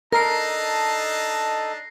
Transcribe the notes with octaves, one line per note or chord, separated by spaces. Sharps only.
D4 D#4 A4 A#4 D#5 A5 A#6 C7